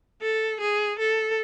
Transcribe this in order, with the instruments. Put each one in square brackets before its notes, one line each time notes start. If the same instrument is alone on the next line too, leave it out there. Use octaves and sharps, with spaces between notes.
[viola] A4
G#4
A4